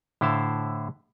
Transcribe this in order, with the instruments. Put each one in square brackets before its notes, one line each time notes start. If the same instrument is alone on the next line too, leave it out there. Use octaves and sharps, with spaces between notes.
[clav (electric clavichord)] A2 D3 E4 C5 F5 A5